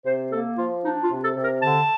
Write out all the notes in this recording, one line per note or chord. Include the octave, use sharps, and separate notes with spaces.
C3 C5
A#3 A4
F3 F4
D4 D#4
F4
C3
A4
C3
A#4
D3 A5